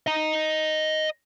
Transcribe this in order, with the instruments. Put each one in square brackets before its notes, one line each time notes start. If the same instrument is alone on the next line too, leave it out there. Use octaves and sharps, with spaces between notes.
[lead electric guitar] D#5 A#5